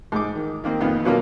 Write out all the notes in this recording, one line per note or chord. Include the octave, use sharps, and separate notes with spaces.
G#2 D6
D#3
D#3 A#3 C4
F2 A#2 D#3 B3 F4
B2 F#3 A#3 C#4 F4